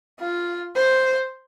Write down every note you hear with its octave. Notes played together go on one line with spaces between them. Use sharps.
F4
C5